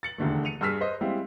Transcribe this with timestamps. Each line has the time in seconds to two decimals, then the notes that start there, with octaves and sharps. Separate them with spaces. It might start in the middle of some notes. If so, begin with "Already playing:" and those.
0.03 A6 C#7 F#7
0.18 E1 D#2 D3 A3
0.45 C#7 D#7 F7
0.61 G2 G#4 E6 F6 B6
0.80 B4 C5 D#5
1.01 G3 G#3 C4 E4 F5